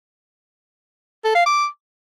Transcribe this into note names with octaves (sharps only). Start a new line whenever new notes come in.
A4
F5
D6